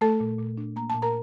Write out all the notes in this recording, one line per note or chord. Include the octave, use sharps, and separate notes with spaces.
A3 A4 A5
A#2
A#2
D4
A#3 A#5
A#2 A5
A#4 A#5